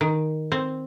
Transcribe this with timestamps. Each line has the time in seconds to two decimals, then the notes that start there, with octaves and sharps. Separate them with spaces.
0.01 D#3
0.52 C4